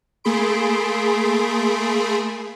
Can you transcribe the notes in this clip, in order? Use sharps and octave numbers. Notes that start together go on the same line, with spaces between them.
A3 A#3 G#4 B5 C6 D7